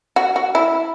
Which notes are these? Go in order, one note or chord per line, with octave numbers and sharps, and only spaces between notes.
F#4
F#4
E4